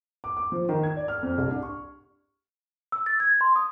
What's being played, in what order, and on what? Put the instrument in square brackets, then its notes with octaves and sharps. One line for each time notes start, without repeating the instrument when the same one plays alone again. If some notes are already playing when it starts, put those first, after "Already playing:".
[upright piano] D6
D6
F3
D#3
G#6
D5
F6
F2
C2
D4
C#6
[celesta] E6
A6
G#6
C6
D#6